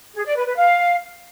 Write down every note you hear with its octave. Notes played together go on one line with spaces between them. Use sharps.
G#4
D5
B4
B4
F5